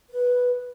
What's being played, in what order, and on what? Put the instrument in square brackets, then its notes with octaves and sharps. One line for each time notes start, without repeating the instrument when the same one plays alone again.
[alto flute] B4